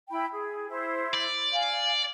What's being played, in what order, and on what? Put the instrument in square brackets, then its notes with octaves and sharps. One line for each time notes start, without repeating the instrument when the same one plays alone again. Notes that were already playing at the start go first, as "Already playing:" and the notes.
[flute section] E4 G5 B5
G#4
E4 C5
[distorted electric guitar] D5
[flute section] F5 G#5